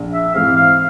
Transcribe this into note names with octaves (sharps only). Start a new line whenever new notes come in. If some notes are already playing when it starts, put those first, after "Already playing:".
Already playing: A#1
E5
G#2 E3 G#3 C4 F5
F5